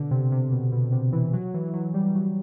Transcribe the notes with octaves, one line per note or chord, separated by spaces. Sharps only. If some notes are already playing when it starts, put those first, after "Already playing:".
Already playing: B2 D3
C3
C3
B2
B2
C3
E3
F#3
E3
F#3
G3
F#3